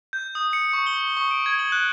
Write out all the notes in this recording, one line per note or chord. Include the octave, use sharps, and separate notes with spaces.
G6
D#6
C#7
C#6
G7
C#7
C#6
D7
G#6
F#7
F#6